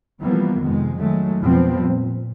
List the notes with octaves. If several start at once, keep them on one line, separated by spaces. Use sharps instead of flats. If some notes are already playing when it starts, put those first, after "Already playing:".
E3 F3 G3 A#3 B3
F2 C3 D#3 G#3
D#3 F#3 G#3 A3
F2 B2 F3 G3 B3 C4
A#2